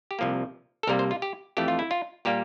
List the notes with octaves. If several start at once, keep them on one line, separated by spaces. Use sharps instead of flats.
G4
C2 C3 F3 A#3
A4
C2 C3 G3 A#3 A#4
C5
F4
G4
F2 E3 A3 G4
F4
E4
F4
A#2 G3 A#3 G4